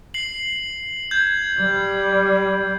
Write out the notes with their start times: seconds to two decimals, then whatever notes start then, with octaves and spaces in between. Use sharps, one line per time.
0.14 C7 F#7
1.11 G6 G#6
1.60 G3